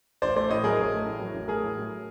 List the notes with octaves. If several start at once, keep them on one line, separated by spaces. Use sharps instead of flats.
A1 C5 D5
A3 C5 D5
A2 C#5 D#5
F#3 G#4 A#4
A1
A3
A2
F#3
A1
A3 G#4 A#4
A2
F#3